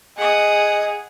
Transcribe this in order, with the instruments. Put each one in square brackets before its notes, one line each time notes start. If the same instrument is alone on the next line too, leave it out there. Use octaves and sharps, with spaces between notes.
[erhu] G#4 [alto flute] D#5 [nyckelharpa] F#5 D#6